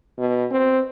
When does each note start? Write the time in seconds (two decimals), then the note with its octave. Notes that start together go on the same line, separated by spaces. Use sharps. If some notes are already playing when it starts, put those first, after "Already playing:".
0.18 B2
0.51 C4